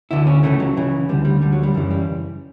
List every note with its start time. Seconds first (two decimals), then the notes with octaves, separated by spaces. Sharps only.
0.11 D2 D3 E4
0.27 C#4
0.43 C#2 C#3 E3 A3
0.60 F#3
0.77 C#2 C#3 E3
1.09 D2 D3 G3
1.25 G3
1.41 D2 D3 G3
1.53 F#3
1.63 G3
1.74 F#2 C#3 E3
1.91 G3